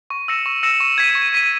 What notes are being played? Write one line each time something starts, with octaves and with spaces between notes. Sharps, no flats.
C#6
E6 A#6 C#7 E7
C#6
E6 A#6 C#7 E7
C#6
G#6 B6 D#7
C#6
G#6 B6 D#7